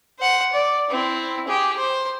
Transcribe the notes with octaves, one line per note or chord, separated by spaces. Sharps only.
C5 F#5
D5
C4 E4
G4 G#4
C5